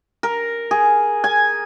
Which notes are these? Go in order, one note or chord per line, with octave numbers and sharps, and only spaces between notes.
A#4
G#4
G#5